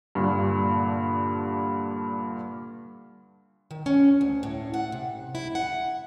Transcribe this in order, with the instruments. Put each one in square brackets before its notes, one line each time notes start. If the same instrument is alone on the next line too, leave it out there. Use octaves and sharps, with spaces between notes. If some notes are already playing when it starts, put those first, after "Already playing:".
[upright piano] G2 A#2 D3
[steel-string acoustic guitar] D#3
C#4
D2
A2
F#5
C3
E4
F#5